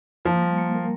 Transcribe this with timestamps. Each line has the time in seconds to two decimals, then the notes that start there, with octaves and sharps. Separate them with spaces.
0.25 F3 A#3
0.41 G3
0.58 A#3
0.74 A#4